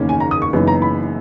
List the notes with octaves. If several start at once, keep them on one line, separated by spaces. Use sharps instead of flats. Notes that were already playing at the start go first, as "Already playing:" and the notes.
Already playing: F#1 E2 D#3 A#3 C#4
G#5
A#5
D#6
C#6
F#1 F#2 E3 B3 D#4
A#5
B5